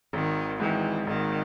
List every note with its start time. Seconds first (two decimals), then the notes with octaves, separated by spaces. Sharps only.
0.13 G#1 D#3
0.60 G#2 D#3 E3
1.07 G#1 D#3